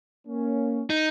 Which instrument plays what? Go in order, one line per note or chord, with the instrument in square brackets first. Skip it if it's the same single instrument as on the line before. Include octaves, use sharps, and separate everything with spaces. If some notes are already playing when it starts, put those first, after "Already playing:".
[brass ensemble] A#3 C#4
[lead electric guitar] D#4